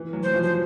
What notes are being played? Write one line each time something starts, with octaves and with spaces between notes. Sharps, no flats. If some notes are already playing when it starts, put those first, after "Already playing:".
Already playing: E3
F#3
F#3 C5
F3
C5